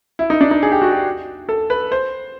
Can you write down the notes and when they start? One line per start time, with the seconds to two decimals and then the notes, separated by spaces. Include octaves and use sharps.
0.19 E4
0.30 D#4
0.41 D4
0.51 D#4
0.63 G#4
0.72 G4
0.82 F#4
0.91 G4
1.49 A4
1.70 B4
1.92 C5